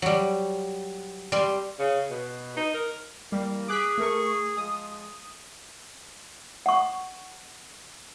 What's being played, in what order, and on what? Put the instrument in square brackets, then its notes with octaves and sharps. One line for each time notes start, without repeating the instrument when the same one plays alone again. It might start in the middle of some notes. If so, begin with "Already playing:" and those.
[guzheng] F#3 G3
G3 C6
[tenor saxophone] C#3
B2
D#4
A#4
[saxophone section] E3 A#3 [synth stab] G3
[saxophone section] G#4 [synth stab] D6 F#6 B6
[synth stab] A3 A#4 C#6
[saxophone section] F3 G#3 [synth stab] D#6
[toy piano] F#5 C#6